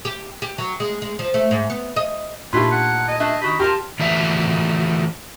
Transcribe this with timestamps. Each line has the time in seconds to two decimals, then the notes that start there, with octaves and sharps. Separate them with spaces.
0.05 G4
0.42 G4
0.58 F#3
0.80 G#3
1.02 G#3
1.19 F3
1.34 A3
1.51 G#2
1.70 B3
1.96 D#5
2.53 A#2 A3 D4 D#4 F4 G4 B5
2.71 F#5
3.08 D#5
3.20 A3 D4 E5
3.42 D#3 F#4 G4 B5
3.59 F3 F4 G4 A#4 A5
3.99 E3 F3 A3 F#4 E5